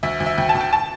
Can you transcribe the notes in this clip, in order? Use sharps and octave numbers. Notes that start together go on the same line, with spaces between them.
D2 E5
D2
E5
D2 G5
A5
D2
G5
A5